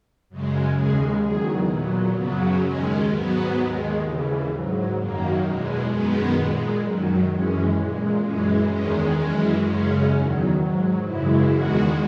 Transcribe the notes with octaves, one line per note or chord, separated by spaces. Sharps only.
F#2 C#3 G#3
D#2 C#3 G#3 G#4
E2 D#3 F#3 G#4
A#2 F#3 B3
F#2 C#3 F#3 B3
D#2 D#3 G#3 C#4
G#2 F#3 B3
D#2 D#3 G#3
D#2 C#3 E3
G#2 F#3
F#2 D#3 F#3 A#3
E2 B2 G#3
F#2 D#3 G#3 B3
A#2 G#3
F#2 D#3 F#3
F#2 E3 G#3 C#4
A#2 G#3
F#2 E3 G#3 C#4
E2 D#3 G#3 C#4
F#2 E3 G#3 C#4
F#2 C#3 G#3 C#4
E2 D#3 F#3
G#2 F#3
F#2 C#3 E3 G#3 E4
E2 D#3 G#3 F#4